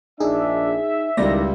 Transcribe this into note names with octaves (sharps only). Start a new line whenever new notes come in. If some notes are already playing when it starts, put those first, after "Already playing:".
A#1 A#3 D4 D#4 G#4 E5
C#2 D#3 G3 E4 D5 A#6